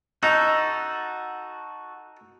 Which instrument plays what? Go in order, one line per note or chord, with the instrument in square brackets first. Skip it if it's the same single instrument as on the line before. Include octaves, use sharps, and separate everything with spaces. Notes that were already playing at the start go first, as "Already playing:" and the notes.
[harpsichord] D#4 [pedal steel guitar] F#4 A4